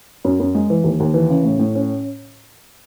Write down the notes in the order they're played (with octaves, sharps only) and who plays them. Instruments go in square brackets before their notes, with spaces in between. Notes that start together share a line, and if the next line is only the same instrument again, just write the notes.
[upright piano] F#2
F#2
G#3
E3
D#2
D#2
E3
C#3
A2
A2
C#4